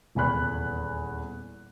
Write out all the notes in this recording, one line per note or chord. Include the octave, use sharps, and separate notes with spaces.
D#1 E2 G#5 B5 F#6